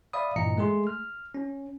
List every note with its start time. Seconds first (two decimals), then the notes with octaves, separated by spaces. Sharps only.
0.13 D5 E5 F5 B5 D#6
0.36 G2 A#2 E3 D#5 A#5 C#7
0.57 G#3 A3 G#4 C6
0.87 F6
1.34 C#4